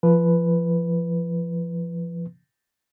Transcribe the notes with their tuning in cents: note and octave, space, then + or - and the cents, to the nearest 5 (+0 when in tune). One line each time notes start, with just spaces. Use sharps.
F3 -30 B4 +0